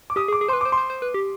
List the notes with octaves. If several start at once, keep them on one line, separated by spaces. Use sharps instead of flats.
D6
G4 D#6
G#4
D6
G#4
B4 C5 C6
C5 D6
C6
C5
C5
B4
G4